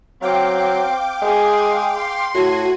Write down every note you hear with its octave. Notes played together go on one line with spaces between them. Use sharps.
F#3 C4 F5 G5 D6
G#3 G#4 C6
C6
A2 F#4 G#6 D#7